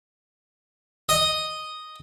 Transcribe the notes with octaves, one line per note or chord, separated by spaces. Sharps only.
D#5 D#6